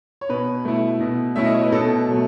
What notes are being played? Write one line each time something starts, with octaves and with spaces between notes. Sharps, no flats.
C#5
B2 B4
A3 E4
B2
A3 C#4 E4 E5
D#5
C#5
B4
B2 A4
F#3 A3